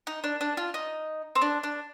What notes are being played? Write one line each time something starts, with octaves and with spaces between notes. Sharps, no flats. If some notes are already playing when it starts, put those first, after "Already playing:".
D#4
D4
D4
F4
D#4
C4
D4
D4